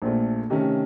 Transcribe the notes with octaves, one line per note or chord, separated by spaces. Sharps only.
A#1 A#2 A3
C3 D#3 A3 C#4